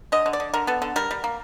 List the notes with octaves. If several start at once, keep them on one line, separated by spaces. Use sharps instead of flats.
D3 D#5
D3
D5
D3
D3 A#4
B3 A4
D3 A4
G3 A#4
G3
A#3